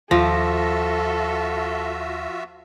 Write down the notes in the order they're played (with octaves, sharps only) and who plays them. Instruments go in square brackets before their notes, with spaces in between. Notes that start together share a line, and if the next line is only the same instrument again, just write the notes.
[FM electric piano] D#2 A#6 [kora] F3 [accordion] F4 F#4 E5 [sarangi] A4